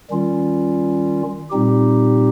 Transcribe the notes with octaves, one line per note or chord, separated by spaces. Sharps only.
D#3 G3 C#4 F4
A#2 G3 C4 D#4 G4